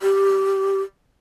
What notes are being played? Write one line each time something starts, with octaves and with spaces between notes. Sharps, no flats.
G4